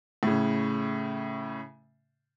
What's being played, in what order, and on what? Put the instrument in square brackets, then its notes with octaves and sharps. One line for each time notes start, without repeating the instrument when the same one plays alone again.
[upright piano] A2 C#3